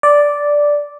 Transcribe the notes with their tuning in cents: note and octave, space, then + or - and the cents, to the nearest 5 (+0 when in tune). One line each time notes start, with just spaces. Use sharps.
D5 -5